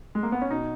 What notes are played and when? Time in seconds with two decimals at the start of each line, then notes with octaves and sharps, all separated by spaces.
0.15 G#3
0.23 A#3
0.32 B3
0.42 C#4
0.50 B2 D#4